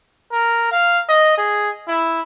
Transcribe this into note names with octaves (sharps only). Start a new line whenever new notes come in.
A#4
F5
D#5
G#4
E4